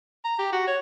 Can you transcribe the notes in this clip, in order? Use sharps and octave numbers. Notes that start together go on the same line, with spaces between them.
A#5
G4
F#4
C#5